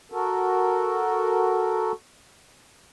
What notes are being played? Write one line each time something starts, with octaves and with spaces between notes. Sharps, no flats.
F#4 A4 A#4